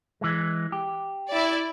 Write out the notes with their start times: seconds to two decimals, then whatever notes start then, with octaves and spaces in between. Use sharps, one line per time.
0.21 E3 G#3
0.72 G4
1.29 E4 D5